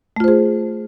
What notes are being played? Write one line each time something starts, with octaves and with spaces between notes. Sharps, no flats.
A3 F4 G#4 C5